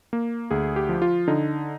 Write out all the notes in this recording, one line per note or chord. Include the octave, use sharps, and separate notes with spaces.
A#3
D2 G#4
G4
F3
F4
D3 D#4